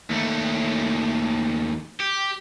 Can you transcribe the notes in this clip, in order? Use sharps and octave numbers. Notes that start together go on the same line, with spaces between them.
D#2 A3
G4